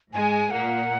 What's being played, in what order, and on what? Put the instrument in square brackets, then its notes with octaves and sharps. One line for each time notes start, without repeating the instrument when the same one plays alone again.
[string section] G#2 G#3 [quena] G#5
[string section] A#2 A#3 [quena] F#5